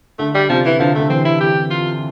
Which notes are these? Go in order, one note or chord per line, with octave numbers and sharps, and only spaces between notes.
D3 A3
G3
C3 F3
E3
D3 F3
D3 A3
E3 C4
E4
G4
F4